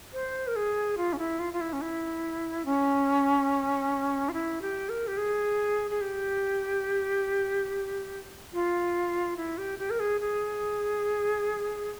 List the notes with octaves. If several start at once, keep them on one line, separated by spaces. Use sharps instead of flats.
C5
A#4
G#4
F4
C#4
E4
F4
F4
E4
C#4
E4
C#4
F4
E4
G4
A#4
G4
G#4
G#4
G4
F4
E4
G4
G4
A#4
G#4
G#4